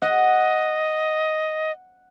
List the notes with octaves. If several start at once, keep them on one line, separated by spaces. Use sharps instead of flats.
D#5 F#5